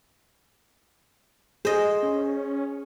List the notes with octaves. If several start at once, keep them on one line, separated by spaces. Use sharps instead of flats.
G#4 C5 D#5
C#4